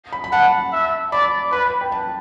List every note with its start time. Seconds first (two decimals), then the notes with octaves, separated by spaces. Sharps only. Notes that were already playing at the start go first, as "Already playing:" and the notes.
0.13 B5
0.24 B5
0.32 F#5 A5
0.72 E5
1.12 D5 B5
1.52 B4 B5
1.81 G5
1.92 A5